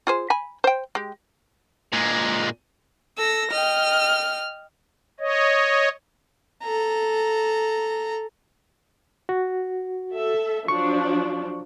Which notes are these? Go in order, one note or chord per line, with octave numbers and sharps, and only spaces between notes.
F4 G#4 C5
G#5 B5
C5 G5
G#3 G4
A#2 G#3
A4 E6 A#6
D#5 G5 F6
C#5 D#5
A4 A#5
F#4
A4 E5
F3 F#3 D4 C#6